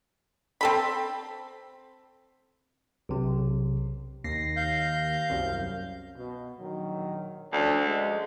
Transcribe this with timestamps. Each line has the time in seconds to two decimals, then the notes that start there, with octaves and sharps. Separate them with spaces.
0.61 C4 A4 B5
3.09 B1 C3
4.24 D#2 A#6 C7
4.56 F5 G6
5.30 C2 F#2
6.17 B2
6.60 A#1 D#3 F#3
7.53 D2 F3 C#4 D4
7.85 G#3